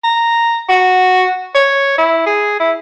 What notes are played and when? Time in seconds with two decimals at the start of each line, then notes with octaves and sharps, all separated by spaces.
0.04 A#5
0.69 F#4
1.55 C#5
1.98 E4
2.26 G#4
2.60 E4